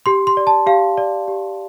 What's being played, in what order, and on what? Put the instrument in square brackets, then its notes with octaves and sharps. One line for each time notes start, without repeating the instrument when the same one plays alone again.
[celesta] G4 C6
C6
D5
A5
G4 F5
D5
G4